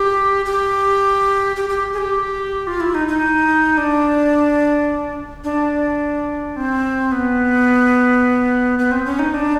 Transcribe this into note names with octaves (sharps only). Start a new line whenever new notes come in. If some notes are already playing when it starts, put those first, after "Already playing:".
Already playing: G4
G4
G4
G4
G#4
G4
F4
E4
D#4
D#4
D4
D4
C4
B3
B3
C4
C#4
D#4
D4